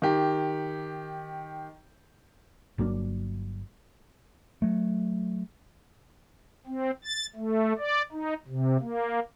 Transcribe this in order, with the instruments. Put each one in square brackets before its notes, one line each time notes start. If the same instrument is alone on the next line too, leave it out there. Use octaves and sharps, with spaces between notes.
[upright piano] D#3 G4
[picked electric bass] G1 F#3 A#3 D4
F#3 A3
[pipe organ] C4
A6
A3
D5
D#4
C3
A#3